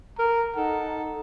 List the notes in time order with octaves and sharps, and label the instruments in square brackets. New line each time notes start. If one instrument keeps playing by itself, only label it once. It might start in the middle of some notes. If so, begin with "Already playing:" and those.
[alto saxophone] A#4 [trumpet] A#5
[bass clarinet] D#4 [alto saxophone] A4 [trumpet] F#5